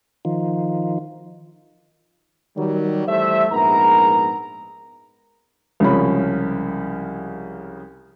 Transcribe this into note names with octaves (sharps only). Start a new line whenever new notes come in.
D#3 F3
D#3 F#3 G3
E3 G3 A3 C5 E5
A#1 G#2 B3 A#4 A#5
C2 C#3 F3 G#3 C#5 B5